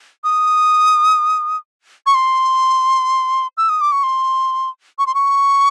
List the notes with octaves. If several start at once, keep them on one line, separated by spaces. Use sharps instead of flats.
D#6
C#6
C6
E6
D#6
D6
C#6
C6
C#6
C6
C#6